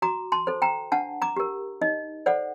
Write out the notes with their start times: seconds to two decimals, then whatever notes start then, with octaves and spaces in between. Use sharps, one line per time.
0.02 F#4 A#5 D6
0.32 A5 C6
0.47 A4 C5
0.62 G5 A#5
0.92 D4 F#5 A5
1.22 A#5 D6
1.37 G4 A#4
1.81 D#4 D#5
2.26 A4 C5 D5 F#5